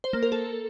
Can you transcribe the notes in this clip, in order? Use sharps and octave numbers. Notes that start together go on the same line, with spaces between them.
C5
A#3
A#4
A4